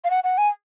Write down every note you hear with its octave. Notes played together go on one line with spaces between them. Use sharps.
F5
F#5
F#5
G#5